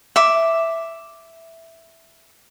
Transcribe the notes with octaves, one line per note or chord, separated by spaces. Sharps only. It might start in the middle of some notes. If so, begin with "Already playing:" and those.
E5 D6